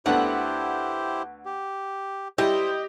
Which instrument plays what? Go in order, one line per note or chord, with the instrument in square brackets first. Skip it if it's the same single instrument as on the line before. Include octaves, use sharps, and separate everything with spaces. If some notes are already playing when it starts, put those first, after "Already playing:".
[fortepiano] D2 D3 B3 [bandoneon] E4 G4 C5 [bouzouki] F#5
[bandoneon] G4
[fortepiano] G3 E4 [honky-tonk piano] G4 [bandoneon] C5 [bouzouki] D#5